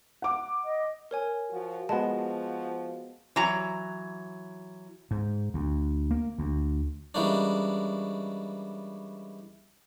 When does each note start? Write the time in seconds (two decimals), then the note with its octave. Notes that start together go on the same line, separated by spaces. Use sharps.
0.22 F#5 D6
0.65 D#5
1.11 A#4 C#5 G#5
1.50 F3 F4 F#4
1.89 F3 G#3 B3 F#4 A5
3.36 E3 F#3 A#5
5.11 G#2
5.54 D2
6.11 A#3
6.38 D2
7.14 E3 G3 G#3 A#3 C#4 D4